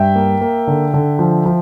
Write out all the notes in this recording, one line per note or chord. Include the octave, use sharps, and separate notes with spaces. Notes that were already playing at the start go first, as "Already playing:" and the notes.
Already playing: G2 E5 G5
A#3
A#3
D3
D3
F3
F3